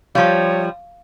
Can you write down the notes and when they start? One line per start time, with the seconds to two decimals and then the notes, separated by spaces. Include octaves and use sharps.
0.15 F3 G3 C#5 F5 C#6